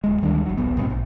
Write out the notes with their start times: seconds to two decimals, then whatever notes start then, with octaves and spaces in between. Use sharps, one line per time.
0.04 D1 G#3
0.22 D2 D#3 G3 D4
0.45 G#1 F#3
0.57 D1 A#1 B3
0.77 C2 G#2 B2 C4
0.90 A#1